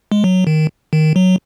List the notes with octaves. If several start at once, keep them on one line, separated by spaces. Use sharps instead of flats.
G#3
F#3
D#3
D#3
F#3